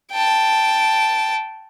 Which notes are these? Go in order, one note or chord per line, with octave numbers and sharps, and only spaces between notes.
G5 A5